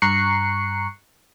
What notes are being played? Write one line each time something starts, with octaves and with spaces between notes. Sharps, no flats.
G2 A#5 C#6 F#6 C7 C#7